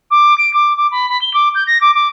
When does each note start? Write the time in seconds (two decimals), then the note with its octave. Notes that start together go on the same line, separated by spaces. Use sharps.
0.10 D6
0.38 D7
0.53 D6
0.76 D6
0.91 B5
1.09 B5
1.21 G7
1.33 D6
1.54 G6
1.67 A#6
1.81 D6
1.94 D6